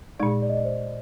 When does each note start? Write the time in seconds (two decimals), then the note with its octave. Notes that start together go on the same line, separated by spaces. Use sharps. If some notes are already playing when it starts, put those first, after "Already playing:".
0.19 A#2 G#3 D#4 D5
0.42 D5
0.49 D#5
0.57 D5
0.65 C5